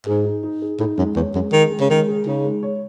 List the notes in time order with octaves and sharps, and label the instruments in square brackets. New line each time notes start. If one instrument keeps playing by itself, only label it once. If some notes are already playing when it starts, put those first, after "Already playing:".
[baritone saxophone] G#2 [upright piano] G#4
[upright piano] D#4
D#4
G#4
[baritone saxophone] A2 [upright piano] D#4
[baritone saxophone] F#2 [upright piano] G#3
[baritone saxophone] E2 [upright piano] C#5
[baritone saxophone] F#2 [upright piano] G#3
[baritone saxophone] D#3 [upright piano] G#4
[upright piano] G#3
[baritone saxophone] C#3
[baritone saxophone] D#3 [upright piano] G#3
[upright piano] G#4
[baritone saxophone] C#3 [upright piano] D#4
[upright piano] G#3
C#5